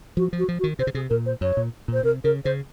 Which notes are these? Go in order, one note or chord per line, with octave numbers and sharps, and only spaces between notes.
F3 F#4
F3
F#4
F3
F#4
D#3
C3 C5
C#3
C3 G#4
A#2 A#4
C5
F#2 C#5
A#2
A#2 C5
C3 A#4
C#3 A#4
C#3 C5